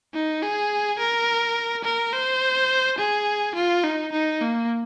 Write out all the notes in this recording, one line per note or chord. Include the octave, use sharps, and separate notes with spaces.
D#4
G#4
A#4
A#4
C5
G#4
F4
D#4
D#4
A#3